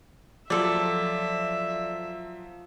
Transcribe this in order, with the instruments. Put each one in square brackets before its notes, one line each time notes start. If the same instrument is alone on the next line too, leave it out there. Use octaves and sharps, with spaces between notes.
[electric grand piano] F3 F#3 [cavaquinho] A4 D5 [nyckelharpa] E5